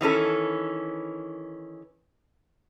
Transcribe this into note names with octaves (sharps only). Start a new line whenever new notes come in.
D#3 E3 C#4 A4